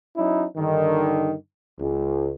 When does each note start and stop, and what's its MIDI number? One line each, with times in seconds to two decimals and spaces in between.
0.17 0.45 54
0.17 0.45 61
0.17 0.45 63
0.17 0.45 64
0.57 1.35 43
0.57 1.35 50
0.57 1.35 51
1.80 2.33 37